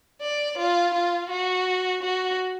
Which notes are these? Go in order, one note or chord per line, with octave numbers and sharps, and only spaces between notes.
D5
F4
F4
F#4
F#4